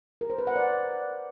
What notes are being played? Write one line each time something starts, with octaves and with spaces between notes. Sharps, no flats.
A#4
C5
B4
F#5
D5